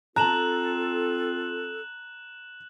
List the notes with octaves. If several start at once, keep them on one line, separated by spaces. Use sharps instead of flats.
C4 F4 A4 A5 A#5 F#6 E7 F#7